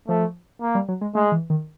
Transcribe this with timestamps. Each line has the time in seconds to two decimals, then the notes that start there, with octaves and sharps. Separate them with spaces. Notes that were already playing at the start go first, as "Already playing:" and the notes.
0.08 F3 A3
0.61 A#3
0.75 G3
0.88 F#3
1.01 G#3
1.15 G#3 A3
1.32 E3
1.50 D#3